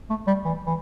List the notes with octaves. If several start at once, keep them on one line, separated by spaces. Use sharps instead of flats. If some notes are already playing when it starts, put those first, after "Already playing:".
A3
G3
E3
E3